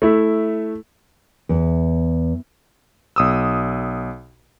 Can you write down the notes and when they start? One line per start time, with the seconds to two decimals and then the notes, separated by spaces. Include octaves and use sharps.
0.02 A3 E4
1.49 E2
3.16 B1 D#6 E6